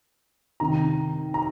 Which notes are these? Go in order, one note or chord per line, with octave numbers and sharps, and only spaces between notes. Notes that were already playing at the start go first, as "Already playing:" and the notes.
C3 D#3 A#5
A#5